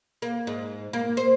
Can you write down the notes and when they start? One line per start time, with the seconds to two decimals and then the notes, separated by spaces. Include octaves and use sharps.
0.22 A#3
0.47 G#2
0.93 A#3
1.17 C5